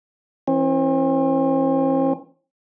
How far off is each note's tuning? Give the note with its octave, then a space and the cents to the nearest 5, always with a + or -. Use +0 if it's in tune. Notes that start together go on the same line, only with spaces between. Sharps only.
E3 +0 C4 +45